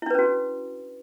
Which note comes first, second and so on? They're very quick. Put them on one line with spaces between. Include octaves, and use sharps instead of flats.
E4 D4 B4 C#4 F#4